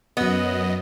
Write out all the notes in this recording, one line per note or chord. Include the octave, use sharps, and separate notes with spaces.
F#2 B3 D#5